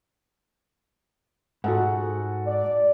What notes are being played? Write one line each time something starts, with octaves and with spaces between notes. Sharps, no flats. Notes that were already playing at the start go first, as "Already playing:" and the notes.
G#2 F#4 A4 F#5
D5